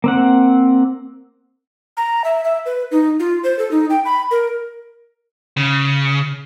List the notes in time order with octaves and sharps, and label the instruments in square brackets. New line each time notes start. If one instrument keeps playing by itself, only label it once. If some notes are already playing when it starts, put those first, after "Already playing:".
[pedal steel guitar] A#3 C4 F#5
[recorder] A#5
E5
E5
B4
D#4
F4
C5
A4
D#4
G5
B5
A#4
[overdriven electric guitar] C#3